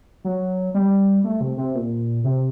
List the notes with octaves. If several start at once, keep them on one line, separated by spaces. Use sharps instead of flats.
F#3
G3
A3
C3
C3
A#2
C3